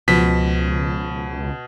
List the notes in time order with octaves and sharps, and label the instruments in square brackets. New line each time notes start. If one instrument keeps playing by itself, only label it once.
[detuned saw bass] C#2 [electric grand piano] B2 B6 [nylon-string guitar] F3